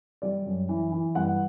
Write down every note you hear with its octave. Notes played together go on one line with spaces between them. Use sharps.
G3 D5
F#2
E3
E3
G2 F#5